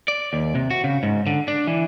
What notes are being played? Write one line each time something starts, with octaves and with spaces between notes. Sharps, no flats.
D5
D#2
C3
F#4
C#3
G#2
D3
D4
E3